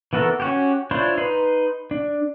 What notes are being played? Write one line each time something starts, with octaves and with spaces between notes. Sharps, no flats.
E3 B3 F#4 A4 A#4
C#4 F#4 G4
D4 E4 F4 C5 C#5
D#4 B4 C6
D4